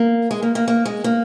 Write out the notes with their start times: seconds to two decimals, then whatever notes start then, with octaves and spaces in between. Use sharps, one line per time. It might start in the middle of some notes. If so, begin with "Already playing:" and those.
Already playing: A#3
0.31 G#3
0.42 A#3
0.55 A#3
0.68 A#3
0.85 G#3
1.04 A#3